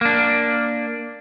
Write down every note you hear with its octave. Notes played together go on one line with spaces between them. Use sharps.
A#3 D4